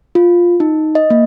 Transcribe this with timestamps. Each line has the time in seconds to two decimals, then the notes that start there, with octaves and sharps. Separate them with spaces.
0.15 F4
0.60 D#4
0.95 D#5
1.10 A#3